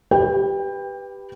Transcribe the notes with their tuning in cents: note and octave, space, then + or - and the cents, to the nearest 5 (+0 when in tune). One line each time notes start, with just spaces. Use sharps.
G4 +0 B4 +0 G5 +25